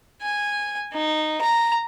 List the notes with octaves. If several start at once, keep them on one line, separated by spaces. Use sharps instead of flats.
G#5
D#4
A#5